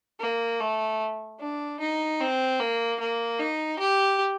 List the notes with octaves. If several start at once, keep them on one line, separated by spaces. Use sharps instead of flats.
A#3
A3
D4
D#4
C4
A#3
A#3
D#4
G4